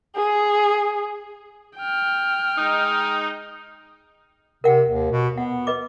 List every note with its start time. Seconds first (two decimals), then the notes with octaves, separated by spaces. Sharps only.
0.16 G#4
1.78 G5 F6
2.58 G#3 D#4
4.64 C3 A#4 F#5 G5
4.89 D#2
5.12 B2
5.38 B3 F#5
5.67 B4 D#5 D6